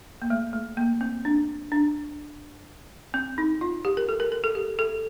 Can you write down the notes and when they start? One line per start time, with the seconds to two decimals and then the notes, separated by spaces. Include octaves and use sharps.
0.22 A#3
0.30 A3
0.53 A3
0.77 A#3
1.01 C4
1.25 D4
1.72 D4
3.14 C4
3.38 D#4
3.61 F4
3.85 G4
3.97 A#4
4.09 A4
4.20 A#4
4.32 A#4
4.44 A4
4.55 G4
4.79 A4